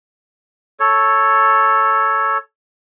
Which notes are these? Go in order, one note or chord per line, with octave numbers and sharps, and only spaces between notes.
A4 C#5